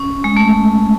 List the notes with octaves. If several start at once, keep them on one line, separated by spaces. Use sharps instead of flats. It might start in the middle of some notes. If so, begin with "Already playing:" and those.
Already playing: C#4
G#3
A3